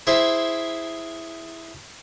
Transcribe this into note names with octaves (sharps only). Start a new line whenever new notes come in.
E4 G#4 C5 E5